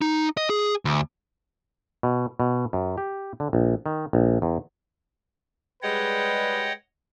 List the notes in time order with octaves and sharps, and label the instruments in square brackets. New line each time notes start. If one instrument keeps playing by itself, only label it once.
[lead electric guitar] D#4
D#5
G#4
D2
[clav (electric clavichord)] B2
B2
F#2
G4
D3
A#1
D#3
A#1
E2
[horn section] G3 G#3 [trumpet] B4 [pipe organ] C#5 D#5 F#5 [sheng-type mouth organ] G5